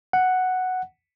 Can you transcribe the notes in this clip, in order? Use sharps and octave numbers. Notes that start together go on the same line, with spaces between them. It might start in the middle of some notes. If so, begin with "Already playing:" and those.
F#5